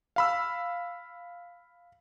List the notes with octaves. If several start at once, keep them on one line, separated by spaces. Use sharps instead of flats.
F5 B5 E6